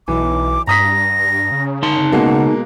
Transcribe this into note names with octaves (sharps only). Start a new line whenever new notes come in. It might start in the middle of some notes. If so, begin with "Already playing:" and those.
B1 E3 D6
G2 A#5 D#6 A#6 B6
C#3
D#4 A5 C6
B2 G#3 A#3 F#5